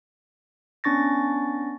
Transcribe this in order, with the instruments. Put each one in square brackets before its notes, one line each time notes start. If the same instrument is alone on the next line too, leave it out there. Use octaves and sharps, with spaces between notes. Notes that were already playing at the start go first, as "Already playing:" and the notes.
[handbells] B3 C#4 D4 C#6 A6 A#6